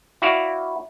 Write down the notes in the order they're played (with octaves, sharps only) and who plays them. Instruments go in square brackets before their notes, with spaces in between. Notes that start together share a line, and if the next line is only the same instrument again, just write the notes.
[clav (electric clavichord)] E4 F#4 D5 F5